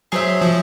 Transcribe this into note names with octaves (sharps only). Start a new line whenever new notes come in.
F#3 G#4 C5 E5
F3